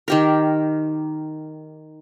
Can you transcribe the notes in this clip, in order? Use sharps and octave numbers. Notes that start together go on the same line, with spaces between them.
D#3 G4 A#4